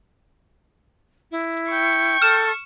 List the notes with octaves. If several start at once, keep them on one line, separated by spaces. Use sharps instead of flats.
E4
G5 C#6
A4 F6 E7